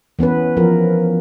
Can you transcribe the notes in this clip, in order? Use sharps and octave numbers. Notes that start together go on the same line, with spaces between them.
E3 B3 C#4 B4
F3 A#4